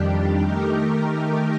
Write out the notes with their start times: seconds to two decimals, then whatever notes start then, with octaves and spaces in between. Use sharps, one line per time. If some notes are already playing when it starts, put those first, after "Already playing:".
Already playing: F2 D#3 G3 D4 G4
0.40 D#3 A3 D#4 G4 A#4